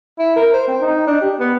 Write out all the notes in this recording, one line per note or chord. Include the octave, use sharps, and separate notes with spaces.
E4
A#4
C5
C4
D#4
D4
G4
B3